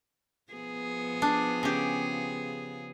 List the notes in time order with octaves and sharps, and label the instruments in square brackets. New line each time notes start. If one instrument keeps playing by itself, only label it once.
[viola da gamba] F3 B3 G#4
[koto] D4
C#3 G4